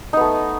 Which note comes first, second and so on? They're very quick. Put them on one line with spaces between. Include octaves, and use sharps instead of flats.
D#4 B3 A3